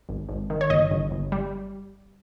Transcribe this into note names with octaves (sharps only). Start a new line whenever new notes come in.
G#1
G#1
D#3
C#5
G1 D#5
G1
G1
G3